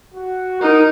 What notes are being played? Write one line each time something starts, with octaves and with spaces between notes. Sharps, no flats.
F#4
D#4 A#4